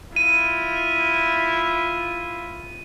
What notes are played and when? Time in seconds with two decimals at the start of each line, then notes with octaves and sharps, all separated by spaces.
0.16 E4 F4 D#7